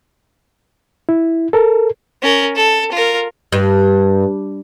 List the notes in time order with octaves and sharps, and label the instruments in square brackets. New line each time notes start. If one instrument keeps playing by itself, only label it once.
[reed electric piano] E4
A4 A#4
[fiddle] C#4 A#4
A4
F4 A#4
[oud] G2